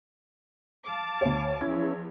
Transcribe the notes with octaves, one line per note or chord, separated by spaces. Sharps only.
F5 A5 D6
D2 C#5
E2 F3 C#4 E4 G#6